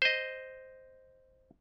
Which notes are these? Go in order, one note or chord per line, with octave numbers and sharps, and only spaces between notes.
C5 D#5